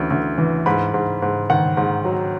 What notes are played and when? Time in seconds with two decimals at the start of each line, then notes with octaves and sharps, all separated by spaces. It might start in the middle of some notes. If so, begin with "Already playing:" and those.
Already playing: D2 C#3 E3
0.10 D2
0.38 E3
0.66 G#2 B5
0.94 G#2
1.22 G#2
1.50 D#3 F#5
1.77 G#2
2.05 F#3